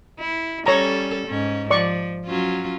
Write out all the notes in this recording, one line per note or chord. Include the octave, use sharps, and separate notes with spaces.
E4
G3 C#4 A4 C#5 A#5
G#2 C#4
F3 D5 C#6
F#3 C#4 F4